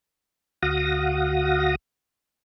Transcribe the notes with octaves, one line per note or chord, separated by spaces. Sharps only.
D2 F#4 F5 F#5 D#6 A#6